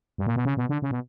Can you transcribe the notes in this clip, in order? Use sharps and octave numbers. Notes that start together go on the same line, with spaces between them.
G2
A#2
B2
C#3
B2
D3
C#3
B2